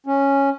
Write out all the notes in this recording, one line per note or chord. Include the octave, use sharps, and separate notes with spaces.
C#4